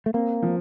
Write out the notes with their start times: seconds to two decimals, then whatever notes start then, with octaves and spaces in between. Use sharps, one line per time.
0.06 A3
0.14 A#3 C4
0.43 F3